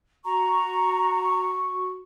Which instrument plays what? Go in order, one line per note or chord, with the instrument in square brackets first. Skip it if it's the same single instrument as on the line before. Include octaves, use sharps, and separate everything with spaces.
[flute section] F#4 C#6 [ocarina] A#5